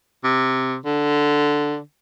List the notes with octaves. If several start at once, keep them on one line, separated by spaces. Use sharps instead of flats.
C3
D3